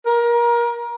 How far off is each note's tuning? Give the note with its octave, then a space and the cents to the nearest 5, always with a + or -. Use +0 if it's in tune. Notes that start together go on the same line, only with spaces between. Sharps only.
A#4 +25